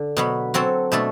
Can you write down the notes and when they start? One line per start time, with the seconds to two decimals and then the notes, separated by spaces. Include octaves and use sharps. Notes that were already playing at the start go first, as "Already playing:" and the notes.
Already playing: D3
0.17 B2 F#3 B3
0.54 F#3 C4 F#4 A4
0.92 B2 A3 D4 A4